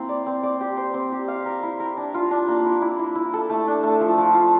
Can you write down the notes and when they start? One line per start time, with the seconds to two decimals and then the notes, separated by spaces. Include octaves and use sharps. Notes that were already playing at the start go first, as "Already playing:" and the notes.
Already playing: A#3 C4 E4
0.09 D5
0.26 C4
0.43 D5
0.61 G4
0.77 C5
0.94 C4
1.12 G4
1.28 F5
1.46 A#4
1.63 E4
1.80 A#4
1.97 D4
2.14 F4
2.31 D4
2.48 A#3
2.65 E4
2.82 E4
2.99 E4
3.15 E4
3.34 A4
3.50 A3
3.68 D4
3.83 A3
4.01 F3
4.18 F3
4.35 F4